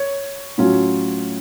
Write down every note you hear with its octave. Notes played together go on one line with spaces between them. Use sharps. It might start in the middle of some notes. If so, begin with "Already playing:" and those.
Already playing: C#5
A2 F#3 C#4 F4